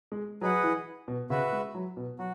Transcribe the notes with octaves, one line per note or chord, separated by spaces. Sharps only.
G#3
F#3 G#4 B4 D#5 F#5
E3
B2
C#3 F#4 B4 E5
G#3
F#3
B2
F#3 F#4